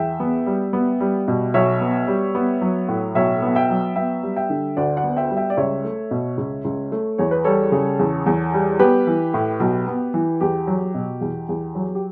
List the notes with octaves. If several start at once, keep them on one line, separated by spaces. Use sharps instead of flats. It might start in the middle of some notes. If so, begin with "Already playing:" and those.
Already playing: E2 E5 G5
B3
G3
B3
G3
B2
B1 C#5 E5
B3
G3
B3
F#3
A2
B1 C#5 E5
B3
E5 G5
F#3
B3 E5 G5
G3
E5 G5
D3
D2 D5 F#5
D5 F#5
B3
E5 G5
G3
E5 G5
D5
C#2 C#5 E5
A3
B2
C#2
C#2
A3
E2 C#5
B4
G3 A4 C#5
C#3
E2
E2
G3
B3 G4 B4
E3
A2
B1
B3
E3
E2 G4
F#3
B2
E2
E2
F#3
G4